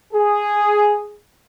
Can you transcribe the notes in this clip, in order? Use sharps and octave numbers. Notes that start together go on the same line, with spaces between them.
G#4